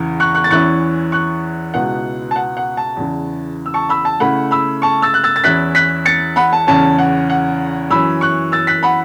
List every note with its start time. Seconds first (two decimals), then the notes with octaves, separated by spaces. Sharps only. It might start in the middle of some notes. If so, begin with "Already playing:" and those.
Already playing: E2 C#3 E3
0.20 C#6 F#6
0.35 C#6 F#6
0.44 A6
0.50 E2 E3 C#4 E4 C#6 F#6
1.12 C#6 F#6
1.74 C#2 B2 B3 E4 F#5
2.31 A5
2.36 F#5
2.57 F#5
2.77 A5
2.97 E2 C#3 E3
3.66 E6
3.74 A5 C#6
3.89 B5 E6
4.05 A5
4.20 C#3 A3 E4 F#5 B5
4.51 B5 E6
4.82 A5 C#6
5.02 E6 A6
5.14 F#6
5.24 E6 A6
5.36 A6
5.44 E2 E3 C#4 E4 F#6 B6
5.75 F#6 B6
6.06 A6 C#7
6.36 F#5 B5
6.53 A5
6.67 E2 C#3 E3 C#4 A5
6.99 F#5
7.30 F#5
7.90 F#2 E3 C#4 B5 E6
8.21 C#6 F#6
8.52 E6 A6
8.67 F#6 B6
8.83 F#5 B5